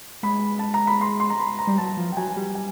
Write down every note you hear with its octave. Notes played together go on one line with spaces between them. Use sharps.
G#3 B5
A5
A#5
B5
C6
C6
A#5
B5
A#5
G3
F#3 A5
F3
G5
F#3 G#5
G3
G#5